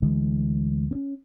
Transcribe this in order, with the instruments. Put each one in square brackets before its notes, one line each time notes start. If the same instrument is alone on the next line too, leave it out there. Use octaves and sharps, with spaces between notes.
[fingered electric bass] D2 D3 E3 G#3
C4 C#4